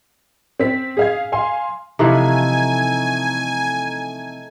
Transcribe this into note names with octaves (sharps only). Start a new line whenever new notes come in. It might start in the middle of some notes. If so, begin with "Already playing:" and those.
C4 B6
G#4 F5 G#6
F5 G#5 C6
C3 E3 F3 A3 D#4 E5 G#5